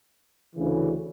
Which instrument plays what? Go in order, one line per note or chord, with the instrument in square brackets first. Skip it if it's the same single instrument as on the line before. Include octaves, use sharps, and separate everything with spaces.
[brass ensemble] D2 C#3 E3